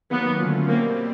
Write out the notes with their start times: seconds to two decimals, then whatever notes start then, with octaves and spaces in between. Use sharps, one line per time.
0.10 D#3 F#3 A#3 B3
0.38 D3 F#3 A3 C#4 F4
0.67 B2 G3 A#3 C4